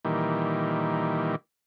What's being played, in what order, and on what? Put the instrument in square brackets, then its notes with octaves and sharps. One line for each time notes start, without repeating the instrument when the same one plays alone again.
[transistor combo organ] A#2 D#3 E3 G3